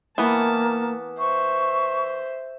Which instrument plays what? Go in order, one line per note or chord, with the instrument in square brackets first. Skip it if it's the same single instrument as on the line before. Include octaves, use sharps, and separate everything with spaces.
[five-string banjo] E3 B3 [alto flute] A#3 [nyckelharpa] A5
[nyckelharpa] C5 E5 [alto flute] C#6